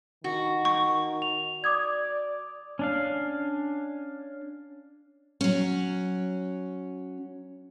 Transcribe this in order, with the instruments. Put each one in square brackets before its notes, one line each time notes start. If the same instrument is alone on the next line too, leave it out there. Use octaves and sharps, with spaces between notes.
[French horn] D#3 [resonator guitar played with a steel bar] F#4
[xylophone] C#6
[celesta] F7
[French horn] D5 [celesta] D6 D#6 G#6
[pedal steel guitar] C#4 D4 F5
[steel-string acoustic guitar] F#3 C#4